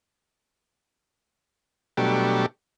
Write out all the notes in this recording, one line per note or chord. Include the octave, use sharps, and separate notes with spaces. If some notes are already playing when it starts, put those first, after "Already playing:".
B2 F#3 G3 A3 D4 G4